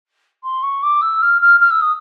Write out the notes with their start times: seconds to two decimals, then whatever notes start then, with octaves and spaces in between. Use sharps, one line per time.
0.44 C6
0.63 C#6
0.83 D6
1.01 E6
1.22 F6
1.42 F6
1.60 F6
1.71 E6
1.81 D#6